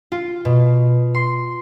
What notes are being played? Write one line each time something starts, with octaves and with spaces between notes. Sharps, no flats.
F4
B2
C6